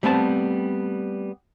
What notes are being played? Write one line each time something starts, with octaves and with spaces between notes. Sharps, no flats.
G3 A3 B3 C4 G#5 A5